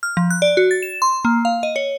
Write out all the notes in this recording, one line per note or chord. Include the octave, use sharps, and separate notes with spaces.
F6
F3
F#6
D5
F#4
A6
E7
C6
A#3
F5
D#5
C#5